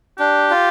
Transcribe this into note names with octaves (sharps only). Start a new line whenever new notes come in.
D4 G4
F4